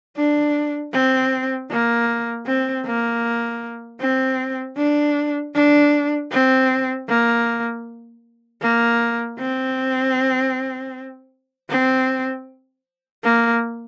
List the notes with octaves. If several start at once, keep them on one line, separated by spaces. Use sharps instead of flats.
D4
C4
A#3
C4
A#3
C4
D4
D4
C4
A#3
A#3
C4
C4
A#3